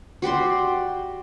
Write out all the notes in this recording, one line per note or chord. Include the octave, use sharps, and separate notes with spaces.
F#4 G4 D5 C6